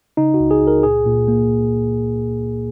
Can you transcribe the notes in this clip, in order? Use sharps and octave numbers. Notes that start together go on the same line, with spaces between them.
C#3 D#4
F#4
C#2
G#4
C#2
A#4
A#2 G#4
A#2
A#3